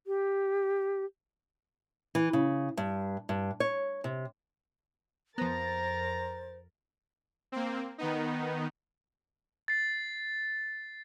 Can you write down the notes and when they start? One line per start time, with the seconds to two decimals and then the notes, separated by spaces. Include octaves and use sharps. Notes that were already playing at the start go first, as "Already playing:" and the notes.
0.07 G4
2.15 E3
2.33 C#3
2.77 G2
3.29 G2
3.60 C#5
4.04 C3
5.38 F2 F3 B3 A#4 C5 A#5 A6
7.52 A#3 C4
7.98 D#3 B3 D#4
9.68 A6 C7